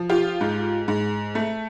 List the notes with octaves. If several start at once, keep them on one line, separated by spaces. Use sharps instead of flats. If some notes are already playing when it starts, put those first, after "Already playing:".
Already playing: F3
F4 G4
G#2
G#2
A3